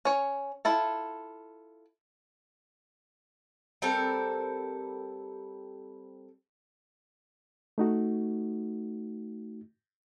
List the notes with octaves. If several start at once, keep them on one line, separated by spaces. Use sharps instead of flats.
C#4 C#5
E4 F4 A4
G3 C4 A4 A#4
A3 D#4 F#4